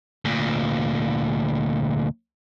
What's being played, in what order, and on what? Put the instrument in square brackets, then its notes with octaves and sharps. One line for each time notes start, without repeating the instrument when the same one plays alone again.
[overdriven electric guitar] D2 A#2